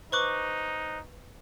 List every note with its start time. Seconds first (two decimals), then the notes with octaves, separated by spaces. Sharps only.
0.12 D#4 B4 C5 C#6 D6 F#6